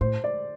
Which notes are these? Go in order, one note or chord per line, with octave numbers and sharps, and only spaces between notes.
A2 C5
D5